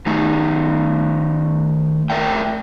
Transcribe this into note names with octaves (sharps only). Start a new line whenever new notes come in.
D#3 A3 D#4
A3 A#4 D5 E5 G5